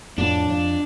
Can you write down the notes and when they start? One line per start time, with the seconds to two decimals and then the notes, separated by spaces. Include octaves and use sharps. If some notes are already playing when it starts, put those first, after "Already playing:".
0.18 F2 A2 D4
0.48 F2